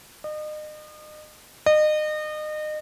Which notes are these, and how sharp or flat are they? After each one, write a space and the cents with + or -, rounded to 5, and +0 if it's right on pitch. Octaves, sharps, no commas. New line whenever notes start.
D#5 -35
D#5 -30